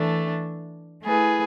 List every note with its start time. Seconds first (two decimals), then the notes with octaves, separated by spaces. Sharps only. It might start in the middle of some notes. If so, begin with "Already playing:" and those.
Already playing: E3 A3 D4
1.03 A3 E4 G#4 B4